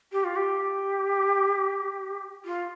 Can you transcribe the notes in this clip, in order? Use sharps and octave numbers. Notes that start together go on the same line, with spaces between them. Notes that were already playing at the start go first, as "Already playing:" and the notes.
G4
F4
G4
F4